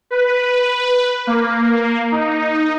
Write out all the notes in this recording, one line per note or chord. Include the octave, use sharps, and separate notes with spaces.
B4
A#3
D#4